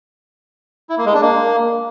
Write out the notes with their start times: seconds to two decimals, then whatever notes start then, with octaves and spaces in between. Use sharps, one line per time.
0.90 E4
0.98 A#3
1.06 G#3
1.13 D4
1.21 A#3